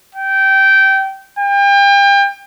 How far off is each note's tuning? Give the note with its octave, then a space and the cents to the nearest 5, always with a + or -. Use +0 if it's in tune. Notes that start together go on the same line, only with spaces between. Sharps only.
G5 -20
G5 +35